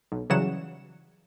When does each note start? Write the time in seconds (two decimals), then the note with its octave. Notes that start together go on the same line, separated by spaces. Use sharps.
0.12 B1
0.30 C#3 E3 F#3 G3 F#5 E7